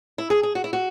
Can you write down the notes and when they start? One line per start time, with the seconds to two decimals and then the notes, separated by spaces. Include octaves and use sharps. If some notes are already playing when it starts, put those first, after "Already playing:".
0.18 E4
0.30 G#4
0.43 G#4
0.55 F#4
0.64 E4
0.73 F#4